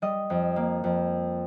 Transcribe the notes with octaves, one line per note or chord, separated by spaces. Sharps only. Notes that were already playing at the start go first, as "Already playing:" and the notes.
G3 D#5
F2
A#3
F2